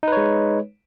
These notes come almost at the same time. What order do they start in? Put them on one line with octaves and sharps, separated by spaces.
D#4 B4 C#5 G#3